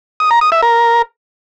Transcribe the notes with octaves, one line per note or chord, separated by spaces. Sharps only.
D#6
A#5
D#6
E5
A#4